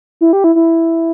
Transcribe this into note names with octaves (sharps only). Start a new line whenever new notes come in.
E4
G4
E4
E4